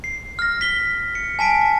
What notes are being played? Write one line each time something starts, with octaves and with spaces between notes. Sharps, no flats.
C7
F6 A#6
B6 G7
C#7
G#5 A5 B6 D7
A5